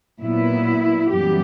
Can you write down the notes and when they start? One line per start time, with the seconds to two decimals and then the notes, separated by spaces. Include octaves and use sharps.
0.20 A#2 F#3 B3 E4
1.11 F#2 E3 G3 B3 G4